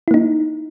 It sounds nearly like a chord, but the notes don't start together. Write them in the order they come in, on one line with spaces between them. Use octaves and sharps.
E4 A#3 D#4